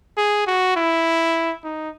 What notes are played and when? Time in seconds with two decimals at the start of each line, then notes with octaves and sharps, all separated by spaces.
0.17 G#4
0.47 F#4
0.76 E4
1.64 D#4